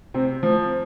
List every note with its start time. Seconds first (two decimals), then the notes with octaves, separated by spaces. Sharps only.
0.14 C3 C4
0.43 F3